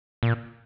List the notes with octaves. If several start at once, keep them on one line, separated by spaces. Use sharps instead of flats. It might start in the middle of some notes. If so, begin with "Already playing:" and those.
A#2